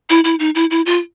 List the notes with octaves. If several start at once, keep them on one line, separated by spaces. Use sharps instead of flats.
E4
E4
D#4
E4
E4
F4